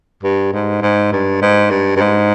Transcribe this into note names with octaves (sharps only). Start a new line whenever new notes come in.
G2
G#2
G#2
G2
G#2
G2
G2
G#2